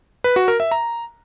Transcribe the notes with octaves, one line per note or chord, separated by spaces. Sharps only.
B4
F#4
A#4
E5
A#5